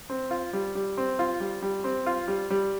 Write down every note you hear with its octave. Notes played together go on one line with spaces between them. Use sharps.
C4
F4
G3
G3
C4
F4
G3
G3
C4
F4
G3
G3